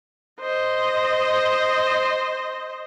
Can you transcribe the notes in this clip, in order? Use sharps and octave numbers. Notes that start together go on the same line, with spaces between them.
C5 D#5